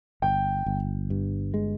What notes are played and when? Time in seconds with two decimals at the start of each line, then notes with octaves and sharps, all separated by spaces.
0.22 G1 G5
0.66 G1
1.10 G2
1.54 G#3